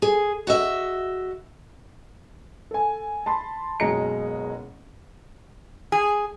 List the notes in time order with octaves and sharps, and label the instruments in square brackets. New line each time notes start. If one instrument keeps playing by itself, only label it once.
[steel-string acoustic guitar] G#4
F#4 D#5 E5
[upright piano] A4 G#5
A5 B5 C6
F#1 B2 G#3 A#5 C#7
[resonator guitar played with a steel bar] G#4